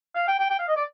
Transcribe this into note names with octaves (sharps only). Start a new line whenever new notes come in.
F5
G5
G5
G5
F5
D#5
D5